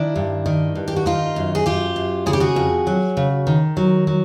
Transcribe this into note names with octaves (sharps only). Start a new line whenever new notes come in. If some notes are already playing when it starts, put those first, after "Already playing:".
Already playing: D#3 D4 E4
G2
D#3
G2
G4
F#4
D#3 D#4 F4
F#2
G#4
F#2 F4 G4
F#2
C#3 G#4
G4
F#4 G#4
F2
F#3
C#3
D#3
F#3
F#3